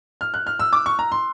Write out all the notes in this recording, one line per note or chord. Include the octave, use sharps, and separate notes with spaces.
F6
F#6
F6
E6
D6
C#6
A#5
C6